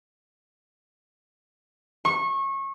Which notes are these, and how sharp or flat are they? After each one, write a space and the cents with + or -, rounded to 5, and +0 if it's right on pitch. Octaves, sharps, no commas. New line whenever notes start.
C#6 -25